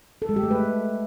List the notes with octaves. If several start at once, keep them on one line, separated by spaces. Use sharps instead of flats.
A4
G#3
G4
A3
B4